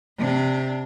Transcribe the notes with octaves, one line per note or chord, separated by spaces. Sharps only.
C3 D4